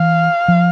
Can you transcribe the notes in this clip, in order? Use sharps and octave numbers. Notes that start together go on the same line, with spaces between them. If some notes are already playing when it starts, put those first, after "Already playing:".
Already playing: E3 F5
F3